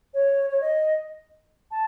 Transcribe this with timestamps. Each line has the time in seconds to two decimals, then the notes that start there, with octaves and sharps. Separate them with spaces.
0.14 C#5
0.50 C#5
0.61 D#5
1.71 A5